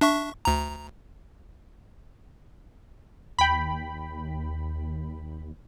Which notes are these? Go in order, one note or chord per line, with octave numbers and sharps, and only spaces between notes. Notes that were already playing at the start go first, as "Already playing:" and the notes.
D4 E5 C#6
D2 A#5
D#2 G5 B5